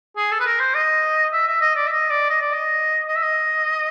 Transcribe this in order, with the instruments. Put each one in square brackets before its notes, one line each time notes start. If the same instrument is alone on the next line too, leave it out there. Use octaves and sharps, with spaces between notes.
[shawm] G#4
A4
B4
A#4
C5
D#5
E5
E5
D#5
D5
E5
D#5
D5
D#5
D5
D#5
D#5
E5
D#5